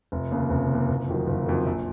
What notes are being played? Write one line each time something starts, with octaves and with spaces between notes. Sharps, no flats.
F1
D#2 C#3
F1
D#2 C#3
F#1
F2 D#3 F#3
F#1
F2 D#3 F#3
A#1